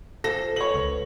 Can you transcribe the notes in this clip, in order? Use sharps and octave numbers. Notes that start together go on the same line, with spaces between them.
F4 A4 C5 A#6
B4 C#5 F#7
C#2